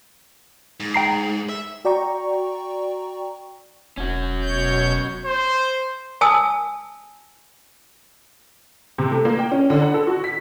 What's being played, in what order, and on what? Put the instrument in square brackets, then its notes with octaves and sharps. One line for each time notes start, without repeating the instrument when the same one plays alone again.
[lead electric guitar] G#2
[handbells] G5 A#5 C7
[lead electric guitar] E5
[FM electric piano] F#4 D5 G5 A#5 C#6
[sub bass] E1 [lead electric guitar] C#4 F#4
[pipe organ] B2 C#5 G6
[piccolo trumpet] C5
[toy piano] G#5 A5 D#6 E6
[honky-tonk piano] C3
A3
A#3
G5
C#4
D3
F#5
A4
F#4
B6